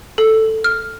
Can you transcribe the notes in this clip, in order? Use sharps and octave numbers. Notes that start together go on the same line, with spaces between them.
A4
F6